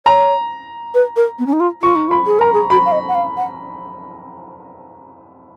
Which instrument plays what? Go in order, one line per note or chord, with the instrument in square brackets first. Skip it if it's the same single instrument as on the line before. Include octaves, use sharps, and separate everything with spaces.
[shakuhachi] C#5 [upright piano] A#5
[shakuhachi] B4
A#4
B3
C#4
D#4
F4
[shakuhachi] F4 [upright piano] C#6
[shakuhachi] D#4
F4
[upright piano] B5
[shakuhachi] G#4
[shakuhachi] A#4 [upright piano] A#5
[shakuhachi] G#4
[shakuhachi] F#4 [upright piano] B5
[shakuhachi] F5
D#5
F#5
F5
F#5